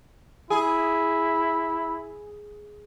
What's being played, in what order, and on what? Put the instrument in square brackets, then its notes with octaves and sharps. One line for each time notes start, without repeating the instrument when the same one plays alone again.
[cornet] E4 [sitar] G#4